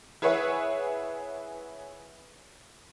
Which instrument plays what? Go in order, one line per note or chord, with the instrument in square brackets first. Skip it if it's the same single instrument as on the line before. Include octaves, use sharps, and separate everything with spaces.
[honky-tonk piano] E4 G#4 B4 C#5 E5 F#5